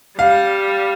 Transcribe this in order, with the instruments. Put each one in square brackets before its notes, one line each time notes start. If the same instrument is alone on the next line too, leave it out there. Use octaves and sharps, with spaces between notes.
[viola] G3 [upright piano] F5